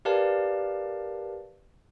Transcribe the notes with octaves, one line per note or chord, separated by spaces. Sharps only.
G4 A#4 B4 D5 F5 A5